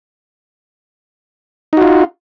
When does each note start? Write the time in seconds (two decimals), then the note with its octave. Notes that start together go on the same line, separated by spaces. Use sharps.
1.73 D#4
1.77 F#4
1.81 F4